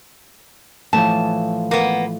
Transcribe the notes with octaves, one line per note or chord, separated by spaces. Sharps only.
A2 E3 F3 A5
A#3 B3